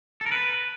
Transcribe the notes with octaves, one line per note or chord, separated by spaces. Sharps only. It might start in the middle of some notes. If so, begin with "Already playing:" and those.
A4
A#4
B4